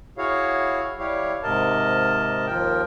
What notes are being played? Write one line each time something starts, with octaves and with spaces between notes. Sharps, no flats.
E4 F#4 G#4 C#5 F5
G3 E4 G4 C#5 F5
G#2 C3 A#4 D#5 A5
D#2 F3 A#4 G5